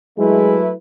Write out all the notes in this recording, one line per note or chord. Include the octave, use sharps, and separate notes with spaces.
F#3 G#3 A3 E4 B4